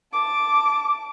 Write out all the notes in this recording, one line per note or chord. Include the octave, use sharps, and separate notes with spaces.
A5 D6